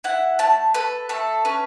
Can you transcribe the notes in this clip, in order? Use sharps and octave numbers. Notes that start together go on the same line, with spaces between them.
E4 F#5
A3 A5
A4 B4
A3 A4
C#4 B4